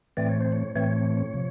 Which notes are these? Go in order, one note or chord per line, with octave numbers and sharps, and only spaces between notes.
A2 E3 A3 C4 D5
C#5
C5
C#5
A2 E3 A3 C4 C#5
C3 F3